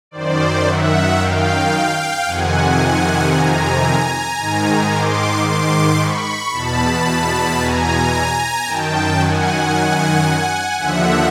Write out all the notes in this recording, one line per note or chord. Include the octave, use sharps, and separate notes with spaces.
F#2 D#3 C5 D5
E5 F#5
F5 G5
F2 C3 D#3 F#5 G#5
G#5 A#5
G#2 D#3
C6 D6
C6 D6
B5 C#6
E2 B2 A5 B5
G#5 A#5
F#2 D#3 G5 A5
F#5 G#5
D#2 D3 F3 E5 F#5